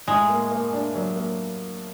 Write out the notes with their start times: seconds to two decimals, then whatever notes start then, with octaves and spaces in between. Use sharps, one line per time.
0.07 A2 G#3
0.29 A#3
0.51 A#3
0.73 D4
0.95 F#3
1.16 A#3